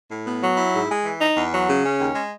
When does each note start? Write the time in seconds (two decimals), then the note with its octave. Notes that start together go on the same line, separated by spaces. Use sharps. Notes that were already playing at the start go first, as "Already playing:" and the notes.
0.10 A2
0.26 B3
0.42 F#3
0.57 E4
0.73 G#2
0.89 G#3
1.05 E3
1.20 D#4
1.36 E2
1.52 F#3
1.68 C#3
1.84 C#4
1.99 D#2
2.15 G#3